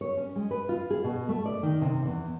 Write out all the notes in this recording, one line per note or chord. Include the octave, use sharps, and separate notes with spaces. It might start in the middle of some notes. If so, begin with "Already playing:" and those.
C#5
C#4
G#3
B4
F4
G#4
B2
A3
D5
D#3
C3
E2